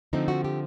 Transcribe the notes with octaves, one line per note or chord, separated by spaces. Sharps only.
D3 F3 A3 C4 D#4
F#4
G4